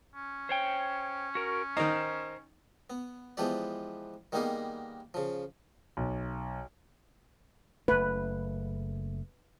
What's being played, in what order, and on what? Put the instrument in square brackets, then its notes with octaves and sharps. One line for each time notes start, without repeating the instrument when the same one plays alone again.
[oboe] C#4
[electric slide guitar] C5 C#5 G5
F#4 A#4
[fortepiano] D#3 D#4 [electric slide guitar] C5 A#5
[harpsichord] B3
E3 F3 G#3 B3 G4 D5
D#3 G3 A#3 B3 D#4 G#4
C#3 F3
[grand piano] B1
[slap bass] F#1 A3 [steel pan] B4